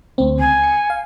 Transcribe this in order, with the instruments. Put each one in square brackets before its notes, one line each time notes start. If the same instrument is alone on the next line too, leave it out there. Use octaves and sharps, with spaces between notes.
[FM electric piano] D2 C4
[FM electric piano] C#2 [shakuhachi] G#5
[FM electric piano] C#7
F5